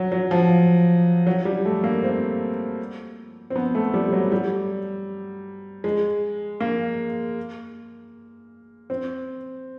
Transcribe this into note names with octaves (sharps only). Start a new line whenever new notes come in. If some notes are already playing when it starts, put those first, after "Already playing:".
Already playing: F#3
F#3
F3
F#3
G3
A3
A#3
C4
C4
B3
A3
G3
F#3
G3
G#3
A#3
C4